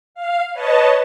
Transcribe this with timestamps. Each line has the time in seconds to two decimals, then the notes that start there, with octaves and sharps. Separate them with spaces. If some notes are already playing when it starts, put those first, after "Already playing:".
0.15 F5
0.53 B4 C#5 D#5 A5